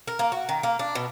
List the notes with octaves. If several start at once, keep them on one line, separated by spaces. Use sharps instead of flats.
A#4
A#3
F#4
D#3
A#3
D4
B2